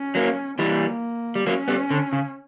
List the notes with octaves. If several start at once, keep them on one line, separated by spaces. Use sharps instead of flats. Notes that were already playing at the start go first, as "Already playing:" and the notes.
Already playing: C#4
F#3 A#3
E3 G3 A#3
G3
F#3 A#3 C#4
G3 B3
D3
C#3